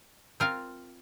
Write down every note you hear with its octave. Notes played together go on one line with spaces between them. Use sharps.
C4 F4 A#4 F5